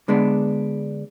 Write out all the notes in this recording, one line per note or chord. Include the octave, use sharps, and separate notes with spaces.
D3 G#3 B3 D4